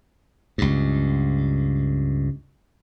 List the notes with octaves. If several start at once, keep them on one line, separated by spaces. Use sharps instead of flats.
C#2 G2